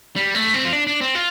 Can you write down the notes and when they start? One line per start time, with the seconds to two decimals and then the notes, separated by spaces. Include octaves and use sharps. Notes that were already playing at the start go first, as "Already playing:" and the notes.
0.16 G3
0.35 A3
0.54 C4
0.65 F4
0.73 D4
0.87 D4
1.01 C4
1.15 F4